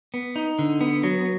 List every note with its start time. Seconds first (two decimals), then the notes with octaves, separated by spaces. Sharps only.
0.14 B3
0.36 D#4
0.59 D3
0.81 B3
1.03 F#3